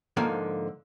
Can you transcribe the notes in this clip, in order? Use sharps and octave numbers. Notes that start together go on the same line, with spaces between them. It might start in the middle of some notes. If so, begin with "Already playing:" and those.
G#2 D3 F3 A#3 F5